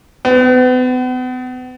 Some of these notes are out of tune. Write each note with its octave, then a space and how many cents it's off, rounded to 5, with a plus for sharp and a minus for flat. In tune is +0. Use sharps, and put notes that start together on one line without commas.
B3 +40